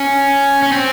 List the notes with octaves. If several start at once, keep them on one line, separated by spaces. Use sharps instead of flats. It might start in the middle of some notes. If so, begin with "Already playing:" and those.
Already playing: C#4
C#4
C4